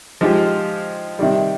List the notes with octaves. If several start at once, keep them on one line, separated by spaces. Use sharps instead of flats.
F3 G#3 D#4 G4
C3 D#3 G3